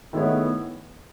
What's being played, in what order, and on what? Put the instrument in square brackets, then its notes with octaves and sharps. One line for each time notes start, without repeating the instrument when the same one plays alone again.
[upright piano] D#3 A3 E4 G#4 C#5 [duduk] B3